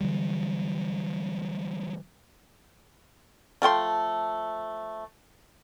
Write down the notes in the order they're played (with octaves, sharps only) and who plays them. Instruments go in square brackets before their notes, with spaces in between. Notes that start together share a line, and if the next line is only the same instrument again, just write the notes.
[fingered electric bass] D3 E3 F#3 G3
[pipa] F3 A3 G5 C6